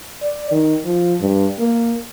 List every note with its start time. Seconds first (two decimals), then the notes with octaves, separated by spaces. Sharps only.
0.22 D5
0.52 D#3
0.85 F3
1.21 G2
1.59 A#3